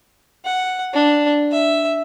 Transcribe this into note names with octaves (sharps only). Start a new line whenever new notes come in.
F#5
D4
E5